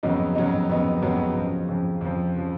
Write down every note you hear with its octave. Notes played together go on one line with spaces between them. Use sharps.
F2 C#3 F#3 B3 D#4
F2 C#3 F#3 B3 D#4
F2 C#3 F#3 B3 D#4
F2 C#3 F#3 B3 D#4
F2 C#3 F3
F2 C#3 F3
F2 C#3 F3
C#3 F3